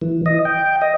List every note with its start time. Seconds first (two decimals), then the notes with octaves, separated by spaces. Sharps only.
0.01 E3
0.26 D#5
0.45 G5
0.82 D#5